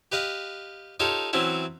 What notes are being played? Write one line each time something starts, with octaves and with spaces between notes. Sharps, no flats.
G4 B4 D#5 F5
D#4 F4 G4 A4 C#5
E3 F#3 C4 C#4 E4